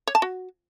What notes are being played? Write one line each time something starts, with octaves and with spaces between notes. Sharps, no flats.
C#5
A5
F#4